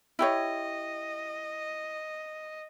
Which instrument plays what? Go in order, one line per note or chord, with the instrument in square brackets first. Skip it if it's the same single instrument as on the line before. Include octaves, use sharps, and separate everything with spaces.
[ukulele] E4 G4 C#5 [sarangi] D#5